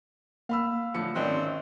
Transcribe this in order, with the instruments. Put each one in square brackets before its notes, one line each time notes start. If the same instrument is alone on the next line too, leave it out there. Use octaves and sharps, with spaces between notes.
[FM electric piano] A#3 [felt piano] F5 B5 E6
[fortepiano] A2 D3 F3 [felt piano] C#7
[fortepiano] G#1 D#3 F#6 [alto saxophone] C4 [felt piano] C#4 D#4 D5